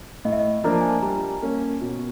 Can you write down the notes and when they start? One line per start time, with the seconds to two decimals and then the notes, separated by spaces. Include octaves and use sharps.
0.25 A2 D#5
0.32 E5
0.39 D#5
0.64 F3 A#3 D4 A#5
0.73 A5
0.81 G#5
0.89 A5
1.02 G3 A#5
1.42 A#3 C#4
1.81 B2